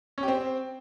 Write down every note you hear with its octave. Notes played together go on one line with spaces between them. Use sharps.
C#4
G4
C4